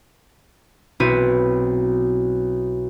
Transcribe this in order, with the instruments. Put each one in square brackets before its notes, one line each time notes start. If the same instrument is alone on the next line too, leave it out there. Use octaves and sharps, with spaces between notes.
[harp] B1 B3 C4 E4 F#4 D#7